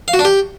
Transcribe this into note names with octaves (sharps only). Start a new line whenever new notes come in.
F5
F#4
D4
G4